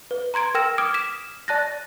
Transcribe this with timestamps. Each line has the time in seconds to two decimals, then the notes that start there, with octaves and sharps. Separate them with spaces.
0.11 B4
0.34 A#5 C6 G#6 D7
0.54 A#4 G5 E6 F6 A#6 E7
0.78 D6 D#6 F6 G#6 D7
0.94 B6 E7
1.48 D5 A5 F#6 A6 A#6